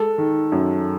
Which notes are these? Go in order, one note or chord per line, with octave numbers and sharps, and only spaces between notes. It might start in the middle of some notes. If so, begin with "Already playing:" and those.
Already playing: G#3 A4
D#3
F#2